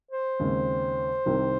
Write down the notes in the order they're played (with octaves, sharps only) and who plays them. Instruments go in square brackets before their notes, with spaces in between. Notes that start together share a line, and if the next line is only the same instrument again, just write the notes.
[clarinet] C5
[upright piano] D#2 C#3 G#3 C4
C2 C3 D#3